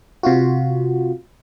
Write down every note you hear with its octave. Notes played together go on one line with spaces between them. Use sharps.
C3 F4 F#4